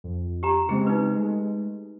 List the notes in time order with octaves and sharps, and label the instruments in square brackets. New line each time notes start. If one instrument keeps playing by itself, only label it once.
[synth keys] F2
[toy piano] G4 A#5
[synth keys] C#3 G#3 C4 [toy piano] G#4
[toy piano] D#4 B4
[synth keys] G#3 A3